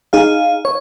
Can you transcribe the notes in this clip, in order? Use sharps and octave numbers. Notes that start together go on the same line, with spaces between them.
D#4 G#4 F5
C#5